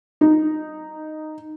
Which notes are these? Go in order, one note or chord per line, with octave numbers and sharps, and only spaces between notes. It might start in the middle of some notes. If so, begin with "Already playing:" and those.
D#4